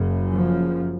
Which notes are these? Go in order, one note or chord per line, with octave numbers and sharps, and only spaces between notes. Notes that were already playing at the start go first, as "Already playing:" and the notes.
Already playing: F#1 F#2 C#3
F3